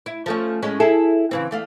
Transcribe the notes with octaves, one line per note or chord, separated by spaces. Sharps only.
E4
F3 A3 C#4
A2 G#3 C#4
E4 G#4 A4
C#3 E3 C4
E2 A3 F5